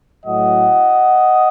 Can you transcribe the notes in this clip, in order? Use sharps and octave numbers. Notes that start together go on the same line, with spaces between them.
A2 F#3 A3 D#5 F#5